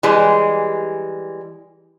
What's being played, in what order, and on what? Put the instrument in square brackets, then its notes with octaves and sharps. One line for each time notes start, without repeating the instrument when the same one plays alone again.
[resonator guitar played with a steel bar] E3 G3 G#3